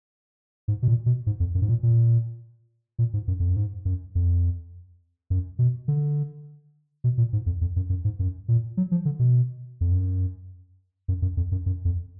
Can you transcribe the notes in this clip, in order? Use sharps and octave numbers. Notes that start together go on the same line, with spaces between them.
G#2
B2
A#2
B2
G#2
F2
F#2
G#2
A#2
A#2
A#2
G#2
F#2
F2
F#2
G#2
F#2
F2
F#2
B2
D3
B2
A#2
G#2
F2
F2
F#2
F#2
G#2
F#2
A#2
F#3
F3
D3
B2
F2
F#2
F#2
F#2
F2
F#2
F#2
F2